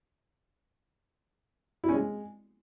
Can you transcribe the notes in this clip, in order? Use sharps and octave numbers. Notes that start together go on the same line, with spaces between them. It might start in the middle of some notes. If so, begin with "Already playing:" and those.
E4
C#4
G#3